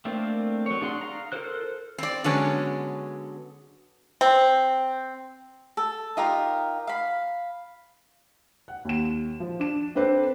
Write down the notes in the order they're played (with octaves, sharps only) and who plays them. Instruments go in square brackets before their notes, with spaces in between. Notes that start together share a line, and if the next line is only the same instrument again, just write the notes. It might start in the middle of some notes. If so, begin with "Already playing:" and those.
[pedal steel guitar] A3 A#3 C4 D4 F4
F#3 C#5
D4 G#4 F#5 C6
F5 A#5
F4 A4 A#4 C5 F#6
[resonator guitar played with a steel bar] C4 D5
D3 F#3 G#3 B3 C#4
[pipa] C4
[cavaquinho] A4
D#4 F4 G4 A#4
F5 B5
[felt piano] F#5
D#2 E7
F3
D4 E7
C4 D4 A4 B4 C5